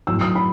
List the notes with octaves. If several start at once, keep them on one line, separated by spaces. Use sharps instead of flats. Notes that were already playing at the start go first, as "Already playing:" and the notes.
A2 F#3 E6
D#6
B5